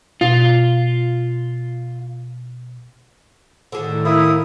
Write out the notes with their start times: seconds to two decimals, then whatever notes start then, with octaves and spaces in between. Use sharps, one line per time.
0.21 B2 F4
3.72 A2 D3 D#3 G#4
4.05 A#3 E4 D#6